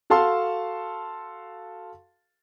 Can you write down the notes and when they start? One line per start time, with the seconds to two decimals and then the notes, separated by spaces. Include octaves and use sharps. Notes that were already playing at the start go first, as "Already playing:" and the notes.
0.10 F#4 A4 F5 A5 C6